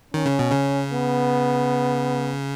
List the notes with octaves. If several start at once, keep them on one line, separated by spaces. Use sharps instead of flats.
D#3 C#4
C#3
B2
C#3
B3